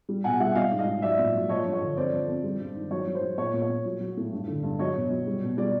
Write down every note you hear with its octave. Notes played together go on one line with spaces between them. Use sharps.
G3
B2 F#5 G#5
G3 E5 F#5
G3 D#5 F5
G#2
D#5 F5
G#2
F#3 D5 E5
A#2
F#3
F3 C#5 D#5
G2
C#5
D3
F2 C5 D5
F3
F2
G3
G2
D#3
F#3 C#5
F#3
C5
F#3
A#2 C#5
A#2
C#5
A#2
F#3
F#3
A2
G2
D3
G2
F#3 C#5 D#5
B2
F#3
G3
B2
G3 D5